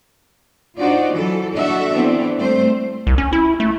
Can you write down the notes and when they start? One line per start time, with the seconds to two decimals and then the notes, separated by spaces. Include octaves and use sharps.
0.79 D4 D#4 F4 F#4 C5 D5
1.12 E3 F#3 A4
1.54 D4 F#4 A4 E5
1.92 E3 B3 C4 D4
2.38 G3 A3 C4 C5
3.07 C2
3.18 C#4
3.33 E4
3.60 A3